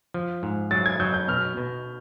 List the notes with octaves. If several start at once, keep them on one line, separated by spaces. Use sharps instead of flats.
F3
G#2
F#3 A6
G#6
F#3 G6
G6
B2 F6
B2